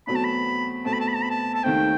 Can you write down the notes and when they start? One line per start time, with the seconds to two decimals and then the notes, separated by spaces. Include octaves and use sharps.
0.07 E2 B2 F#3 A3 C4 B5
0.15 A5
0.24 B5
0.85 B2 A3 C4 A5
0.93 B5
1.01 A5
1.08 B5
1.16 A5
1.23 B5
1.31 A5
1.54 A5
1.64 D#2 D#3 A3 C4 G5